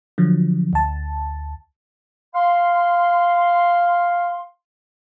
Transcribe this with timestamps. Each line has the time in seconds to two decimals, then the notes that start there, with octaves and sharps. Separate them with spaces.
0.18 D3 F3 F#3
0.73 D2 A5
2.34 F5 C6